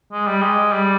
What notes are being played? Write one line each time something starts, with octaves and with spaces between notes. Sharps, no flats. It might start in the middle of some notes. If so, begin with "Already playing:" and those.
G#3
G3
G#3
G3